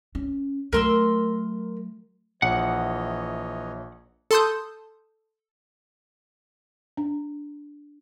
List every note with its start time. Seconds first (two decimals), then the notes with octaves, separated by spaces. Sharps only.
0.15 C#4
0.73 F#3 A3 A#4 C6 E6
2.42 A#1 E3 C#5 D#5 F#5
4.31 A4 A5 C6 D#6 G6
6.97 D4